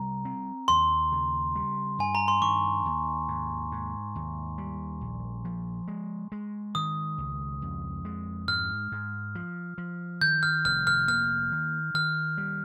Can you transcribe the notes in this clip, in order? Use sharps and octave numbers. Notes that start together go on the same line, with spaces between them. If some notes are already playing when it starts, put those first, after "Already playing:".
Already playing: C3 G3 A#5
C4
D#2 C6
C#3
G3
G2 G#5
A#5
C6
D#3 C#6
D#2
G#2
G#2
D#2
G3
A#1
F3
G#3
G#3
D#3 D#6
C#2
F2
G#3
G#2 F6
G#2
F3
F3
D#3 G6
F6
F1 F6
F6
A#3 F6
D#3
D#3 F6
G3